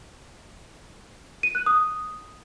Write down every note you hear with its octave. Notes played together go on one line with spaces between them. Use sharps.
D#7
F#6
D#6